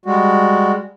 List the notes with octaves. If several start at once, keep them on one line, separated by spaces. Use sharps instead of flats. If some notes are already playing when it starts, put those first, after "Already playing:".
G3 G#3 F#4